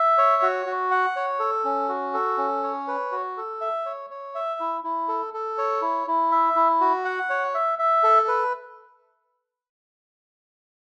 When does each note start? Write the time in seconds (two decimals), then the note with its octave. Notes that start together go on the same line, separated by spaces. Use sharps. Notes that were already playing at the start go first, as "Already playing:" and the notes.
Already playing: E5
0.18 C#5
0.42 F#4
0.66 F#4
0.91 F#5
1.16 C#5
1.40 A4
1.65 C#4
1.89 F#4
2.14 A4
2.38 C#4
2.63 C#5
2.87 B4
3.12 F#4
3.37 A4
3.61 E5
3.86 C#5
4.10 C#5
4.35 E5
4.60 E4
4.84 E4
5.08 A4
5.34 A4
5.58 C#5
5.82 E4
6.07 E4
6.31 E5
6.56 E4
6.81 F#4
7.05 F#5
7.30 C#5
7.54 E5
7.79 E5
8.04 A4
8.28 B4